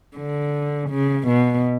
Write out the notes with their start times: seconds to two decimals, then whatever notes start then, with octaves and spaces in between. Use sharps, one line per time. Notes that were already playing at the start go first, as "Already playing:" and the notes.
0.17 D3
0.90 C#3
1.27 B2